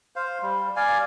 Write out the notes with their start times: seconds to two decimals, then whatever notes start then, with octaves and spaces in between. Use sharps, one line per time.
0.16 C5 F5
0.42 G3
0.76 D5 F5 G#5